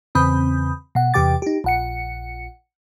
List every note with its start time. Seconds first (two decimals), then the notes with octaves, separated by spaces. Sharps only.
0.15 E2 C#3 C4 B5 D#6 G6
0.95 B2 F#5
1.14 E2 C3 G4 G5 D6 A6
1.42 D#4 G4
1.64 A#1 F#5 C#7